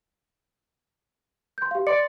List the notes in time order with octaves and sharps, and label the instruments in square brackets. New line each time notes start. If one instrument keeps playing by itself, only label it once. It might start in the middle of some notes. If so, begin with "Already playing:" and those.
[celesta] C6 G6
G4 F5
[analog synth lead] D5 [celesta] C6 C#7